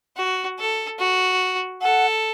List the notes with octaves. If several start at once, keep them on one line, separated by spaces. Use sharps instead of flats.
F#4
A4
F#4
A4 F#5